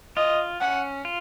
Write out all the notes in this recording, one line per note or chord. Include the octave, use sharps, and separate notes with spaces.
F4 D#5
C#4 F#5
F4